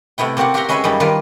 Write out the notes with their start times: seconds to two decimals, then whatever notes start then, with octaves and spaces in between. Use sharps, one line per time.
0.18 C3 A3 B3 E4 G5
0.37 A#3 C4 F#4 G4 D5 F#5
0.54 F#4 G4 E5 F#5 A#5 C6
0.69 G#3 C#4 B4 C#5 E5 G#5
0.84 F#2 C#3 G3 C#4 D#4 B5
1.00 D#3 G3 A#3 F4 B4 D5